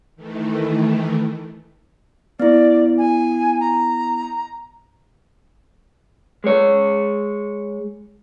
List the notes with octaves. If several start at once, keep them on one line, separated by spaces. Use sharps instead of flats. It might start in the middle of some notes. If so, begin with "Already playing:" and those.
D#3 E3 A3
B3 E4 D5
G#5
A#5
G#3 C#5